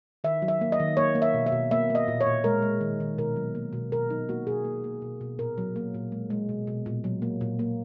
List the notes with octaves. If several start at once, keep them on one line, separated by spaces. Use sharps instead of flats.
D#3 E5
F#3
E5
A#3
D#5
D#3
A#3 C#5
A#3
E5
B2
E5
B2
A#3 E5
A#3
D#5
A#2
C#5
A#2
G#3 A#4
G#3
D#3
D#3
B2 A#4
F#3
A#3
B2
B2 A#4
F#3 D#4
A#3 F#4
B2 G#4
A#3
A#3
B2
B2
A#2 A#4
F#3
A#3
A#2
G#3
G#3
B2
B2
A#2
F#3
A#3
A#2
A#3